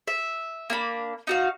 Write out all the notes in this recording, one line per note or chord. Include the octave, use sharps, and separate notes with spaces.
E5
A#3 D4 B5
D#4 F#4 F5